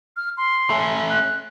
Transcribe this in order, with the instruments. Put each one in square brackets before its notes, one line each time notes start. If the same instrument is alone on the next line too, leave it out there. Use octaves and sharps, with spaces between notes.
[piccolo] F6
C6
[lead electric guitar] A3 C#4
[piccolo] F#6